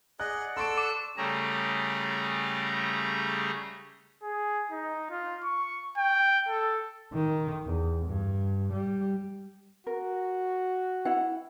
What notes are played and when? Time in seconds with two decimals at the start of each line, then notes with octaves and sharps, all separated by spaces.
0.20 G#4 D5 D#5 F#5 F#6
0.57 A4 A5 C6 C#6 E6 D7
0.78 D6
1.17 C#3 G3 A3 G4 G#4 A#5
4.23 G#4
4.72 D#4
5.10 F4
5.44 C#6
5.98 G5
6.49 A4
7.13 D#3
7.66 E2
8.06 G2
8.73 G3
9.87 F#4 A#4
11.05 E4 F#5